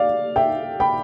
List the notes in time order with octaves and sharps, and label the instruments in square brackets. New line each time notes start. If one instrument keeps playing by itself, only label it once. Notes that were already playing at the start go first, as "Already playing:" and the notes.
Already playing: [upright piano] D5 F5
E5 G5
G5 B5